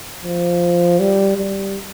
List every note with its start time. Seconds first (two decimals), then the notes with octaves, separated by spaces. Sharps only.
0.25 F3
0.99 G3
1.38 G3